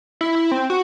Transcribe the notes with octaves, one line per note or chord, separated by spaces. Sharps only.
E4
E4
C4
F#4